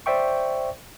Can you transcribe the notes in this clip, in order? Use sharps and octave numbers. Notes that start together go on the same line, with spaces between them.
C5 D5 E5 G5 C#6